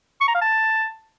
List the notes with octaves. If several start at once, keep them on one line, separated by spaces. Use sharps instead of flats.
C#6
A#5
F5
A5